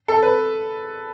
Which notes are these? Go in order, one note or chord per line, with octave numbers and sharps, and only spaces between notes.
A4
B4